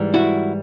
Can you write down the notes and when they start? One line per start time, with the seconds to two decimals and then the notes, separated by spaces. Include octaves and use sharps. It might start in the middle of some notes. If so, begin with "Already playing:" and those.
Already playing: G#2 E3 G3
0.14 E4 F#4